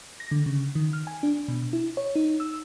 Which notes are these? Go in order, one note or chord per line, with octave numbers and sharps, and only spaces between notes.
A#6
D3
C#3
D#3
F6
G#5
D4
B2
E4
C#5
D#4
E6